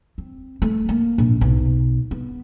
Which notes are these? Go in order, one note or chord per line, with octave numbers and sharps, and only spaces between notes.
C4
A3
A#3
A#1
B1
B3